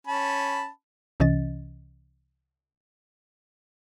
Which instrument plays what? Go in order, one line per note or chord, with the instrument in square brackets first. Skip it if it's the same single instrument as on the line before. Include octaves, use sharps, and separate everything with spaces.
[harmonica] C#4 A5 B5
[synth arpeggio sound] C2 C3 E3 C#4 D#5 A6